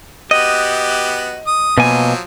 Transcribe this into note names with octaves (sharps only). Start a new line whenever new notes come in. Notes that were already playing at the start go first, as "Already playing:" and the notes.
B3 F#4 G4 D#5
D#6
B2 F3 F#3 A#3 G#5